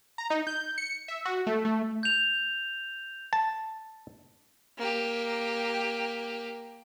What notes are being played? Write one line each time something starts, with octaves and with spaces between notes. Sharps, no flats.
A#5
D#4
G6
C#7
E5
F#4
A3
A3
G6 F7
A5
A#3 G4